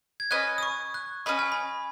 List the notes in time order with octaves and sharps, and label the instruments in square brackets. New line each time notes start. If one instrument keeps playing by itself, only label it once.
[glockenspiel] G#6
[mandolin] C#4 B4 D#5 [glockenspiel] F#6
[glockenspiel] D#6
C#6
F#6
[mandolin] C#4 B4 D#5 [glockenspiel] B5
[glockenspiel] G#5
B5